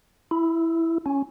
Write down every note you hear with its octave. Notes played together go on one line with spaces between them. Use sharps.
E4
C#4